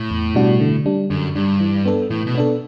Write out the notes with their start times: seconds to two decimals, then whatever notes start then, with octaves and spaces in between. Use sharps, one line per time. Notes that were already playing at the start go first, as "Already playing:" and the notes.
Already playing: A2
0.11 E2
0.35 B2 G3 D4 F#4
0.60 D3
0.86 G3 D4
1.10 F#2 D3
1.35 G2 G3 D4
1.60 E3
1.85 B3 D4 A4
2.10 A2 E3
2.27 B2
2.35 B3 D4 A4